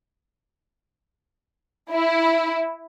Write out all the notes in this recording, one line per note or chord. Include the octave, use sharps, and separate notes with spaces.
E4